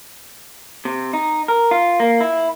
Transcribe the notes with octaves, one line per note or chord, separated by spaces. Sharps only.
C3
D#4
A#4
F4
A#3
E4